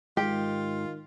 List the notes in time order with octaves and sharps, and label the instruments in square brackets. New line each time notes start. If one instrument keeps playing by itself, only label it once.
[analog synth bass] G#2 [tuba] D#3 [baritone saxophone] F4 [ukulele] G4